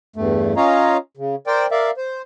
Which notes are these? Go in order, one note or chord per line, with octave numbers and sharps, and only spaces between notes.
E2 G2 A3
C#4 F4 C#5 D#5 F5 A#5
C#3
A#4 C5 D5 G5
A#4 D5 E5 F5
C5